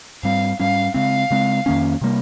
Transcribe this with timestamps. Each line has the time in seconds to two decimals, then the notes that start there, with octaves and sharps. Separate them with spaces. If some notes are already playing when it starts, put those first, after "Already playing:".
0.23 G#2 G3 C4 F5
0.59 G#2 G3 C#4 F5
0.94 C#3 G#3 C4 F5
1.31 C#3 G#3 C4
1.66 F2 D#3 A#3 C#4
2.01 C3 G3 A#3